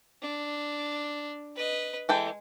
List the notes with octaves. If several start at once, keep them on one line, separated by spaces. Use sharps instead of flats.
D4
B4 D#5
E3 G#3 A4 G5